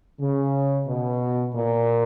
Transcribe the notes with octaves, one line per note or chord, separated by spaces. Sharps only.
C#3
B2
A#2